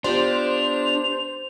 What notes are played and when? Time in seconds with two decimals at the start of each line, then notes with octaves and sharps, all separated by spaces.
0.04 B3 D4 F4 G4 C5 F7